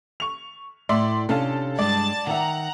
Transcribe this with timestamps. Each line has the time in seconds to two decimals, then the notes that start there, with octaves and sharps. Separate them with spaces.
0.20 C#6 F7
0.89 A2 D5 E5 C6
1.29 C3 C#4 D4 A4 F5 A5
1.79 G2 G#3 D5 A5 A6
2.27 D#3 E5 F#5 A#5